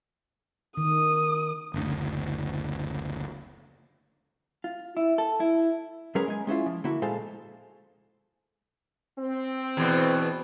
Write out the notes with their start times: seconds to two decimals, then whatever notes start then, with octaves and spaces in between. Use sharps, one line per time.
0.77 D#3 D#6
1.74 F#1 D2
4.64 F4
4.97 E4
5.18 A4
5.40 E4
6.15 F#3 G#3 C#4 G#4 A#4 B4
6.28 G#3 G#5
6.47 G#3 C#4 E4 F4
6.66 F3
6.84 D3 A#3 E4 F#4
7.02 A#2 G#3 A4 C5 F5 A5
9.19 C4
9.77 E2 B2